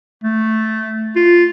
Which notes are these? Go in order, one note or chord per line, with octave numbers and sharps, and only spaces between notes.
A3
F4